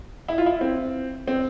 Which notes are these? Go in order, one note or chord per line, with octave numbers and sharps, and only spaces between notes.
E4
F4
E4
C4
C4